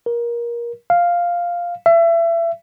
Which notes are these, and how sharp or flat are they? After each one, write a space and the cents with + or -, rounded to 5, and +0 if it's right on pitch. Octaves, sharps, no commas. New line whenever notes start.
A#4 +20
F5 +0
E5 +30